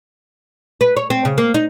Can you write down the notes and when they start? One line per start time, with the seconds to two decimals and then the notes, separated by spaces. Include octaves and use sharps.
0.81 B4
0.97 C#5
1.10 C4
1.25 C#3
1.38 A#3
1.54 D#4